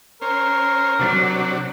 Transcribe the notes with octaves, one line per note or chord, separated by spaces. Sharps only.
C#4 A#4 C5
C3 F#3 D4 F#4